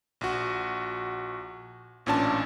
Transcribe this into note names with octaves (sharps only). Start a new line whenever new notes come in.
A#1 F#4
A1 A#2 C#4 D4 A5